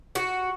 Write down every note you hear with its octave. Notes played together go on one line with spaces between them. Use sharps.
F#4